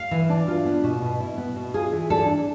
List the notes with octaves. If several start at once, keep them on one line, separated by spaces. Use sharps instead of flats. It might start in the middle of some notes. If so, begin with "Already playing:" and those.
Already playing: F5
E3
D4
F4
B3
B2
B2
E4
B3
B2
F4 G#4
E3
D4 A4
D4